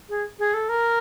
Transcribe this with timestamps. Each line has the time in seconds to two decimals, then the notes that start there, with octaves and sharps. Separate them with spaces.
0.09 G#4
0.39 G#4
0.54 A4
0.69 A#4